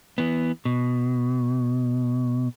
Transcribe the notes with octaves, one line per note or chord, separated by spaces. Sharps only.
E3 B3
B2